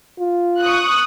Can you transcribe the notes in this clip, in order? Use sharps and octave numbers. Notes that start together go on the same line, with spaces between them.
F4
C#6 D#6 F#6